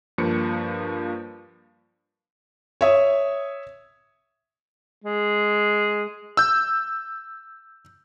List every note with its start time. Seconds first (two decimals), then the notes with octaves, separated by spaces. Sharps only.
0.18 G2 F3 A#3 C#7
2.81 C#5 E5 D#6
5.04 G#3
6.37 E6 G6